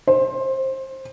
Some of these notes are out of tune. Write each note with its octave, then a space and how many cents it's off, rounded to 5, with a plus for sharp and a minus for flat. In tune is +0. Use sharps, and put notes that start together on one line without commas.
C5 +20